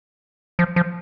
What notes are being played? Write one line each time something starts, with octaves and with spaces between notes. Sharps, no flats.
F3
F3